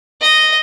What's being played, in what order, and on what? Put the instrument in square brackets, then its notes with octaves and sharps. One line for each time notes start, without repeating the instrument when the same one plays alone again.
[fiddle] D#5